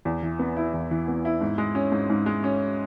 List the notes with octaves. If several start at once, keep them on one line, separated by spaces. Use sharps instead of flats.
E2
E3
B3
E4
E2
E3
B3
E4
G#2
G#3
C#4
G#2
G#2
G#3
C#4